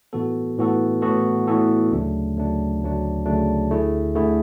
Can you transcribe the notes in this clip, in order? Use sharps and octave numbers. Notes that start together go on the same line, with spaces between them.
A2 E3 B3 F#4 A4
A2 E3 B3 F#4 A4
A2 E3 B3 F#4 A4
A2 E3 B3 F#4 A4
D2 C#3 F#3 A3 D4
D2 C#3 F#3 A3 D4
D2 C#3 F#3 A3 D4
D2 C#3 F#3 A3 D4
D2 D3 A3 E4 G#4
D2 D3 A3 E4 G#4